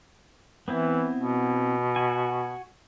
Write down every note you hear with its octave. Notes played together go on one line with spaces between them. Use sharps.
E3 B3 C4 E4
B2
F#4 G#5